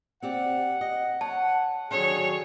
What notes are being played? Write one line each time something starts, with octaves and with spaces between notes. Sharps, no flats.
C4 G4 D5 F#5
D#5
C#5 F#5 A5
D3 D#3 F#3 G#4 C#5